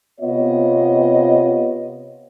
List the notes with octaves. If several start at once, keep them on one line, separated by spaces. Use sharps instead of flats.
C3 B3 F4 C#5 D#5